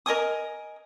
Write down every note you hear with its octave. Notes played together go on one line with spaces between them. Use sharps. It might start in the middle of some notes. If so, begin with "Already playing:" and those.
A#4 D#5 G#5 D#6